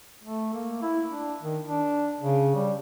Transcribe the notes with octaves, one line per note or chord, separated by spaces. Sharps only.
A3
A#3
E4
D4
D#3
D4
C#3
G3